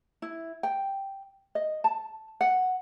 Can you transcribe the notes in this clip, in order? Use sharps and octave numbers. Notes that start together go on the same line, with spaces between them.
E4
G5
D#5
A5
F#5